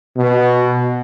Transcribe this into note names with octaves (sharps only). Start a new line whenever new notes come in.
B2